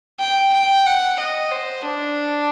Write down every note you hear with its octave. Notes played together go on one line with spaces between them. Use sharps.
G5
G5
F#5
D#5
C5
D4